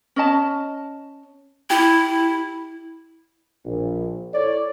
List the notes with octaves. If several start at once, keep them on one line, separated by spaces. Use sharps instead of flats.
C#4 D#5 A5
E4 G4
A#1
E4 A4 C#5 D5